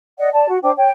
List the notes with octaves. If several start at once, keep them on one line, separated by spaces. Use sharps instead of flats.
D5 D#5 F#5
D5 A5
F#4
D4 C5 G5 D6
C#5 G5